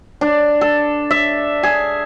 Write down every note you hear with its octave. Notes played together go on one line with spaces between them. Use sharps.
D4
A4
E5
G#4